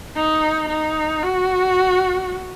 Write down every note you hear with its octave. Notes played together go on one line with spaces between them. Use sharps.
D#4
D#4
F#4